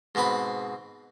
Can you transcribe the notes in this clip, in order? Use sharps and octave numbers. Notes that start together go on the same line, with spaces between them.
G#2 B2 C4 B4 B5